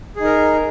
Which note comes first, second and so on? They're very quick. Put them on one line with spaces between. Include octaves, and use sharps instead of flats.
G#4 D#4 A#4